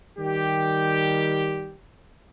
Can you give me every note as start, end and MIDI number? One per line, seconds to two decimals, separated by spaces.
0.18 1.75 51
0.18 1.75 55
0.18 1.75 67